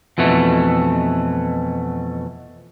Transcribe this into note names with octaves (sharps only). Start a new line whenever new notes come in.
F2 B2 E3 A3